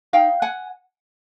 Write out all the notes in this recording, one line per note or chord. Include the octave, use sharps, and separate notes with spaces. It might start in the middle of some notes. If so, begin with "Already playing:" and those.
D#4 F5 G5
F#5 G#5